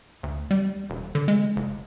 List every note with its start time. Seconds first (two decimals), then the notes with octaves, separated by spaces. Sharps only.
0.23 D2
0.51 G3
0.90 E1
1.15 D3
1.28 G#3
1.56 F#1